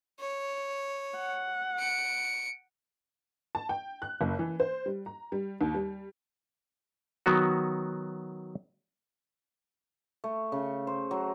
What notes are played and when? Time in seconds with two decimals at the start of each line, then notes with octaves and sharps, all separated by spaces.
0.20 C#5
1.17 F#5
1.79 C#7 D7
3.55 A5
3.69 G5
4.02 F#6
4.21 F#1
4.39 E3
4.60 C5
4.86 G3
5.06 A#5
5.32 G3
5.61 D#2
5.74 G3
7.26 D#3 F#3 B3 F#4
10.24 A3
10.52 C#3
10.87 C5
11.11 F#3